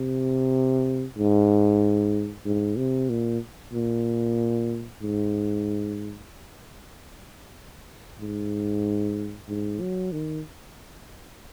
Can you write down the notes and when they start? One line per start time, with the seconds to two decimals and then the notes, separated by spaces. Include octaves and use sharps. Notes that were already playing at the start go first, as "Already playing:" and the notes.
Already playing: C3
1.18 G#2
2.45 G#2
2.77 C3
3.10 A#2
3.73 A#2
5.01 G#2
8.21 G#2
9.49 G#2
9.80 F#3
10.12 D#3